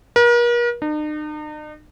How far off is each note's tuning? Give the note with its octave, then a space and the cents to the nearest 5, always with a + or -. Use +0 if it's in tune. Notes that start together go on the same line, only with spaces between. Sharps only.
A#4 +40
D#4 -45